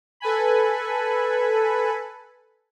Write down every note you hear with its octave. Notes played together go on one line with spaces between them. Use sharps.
A4 B4 G#5 B5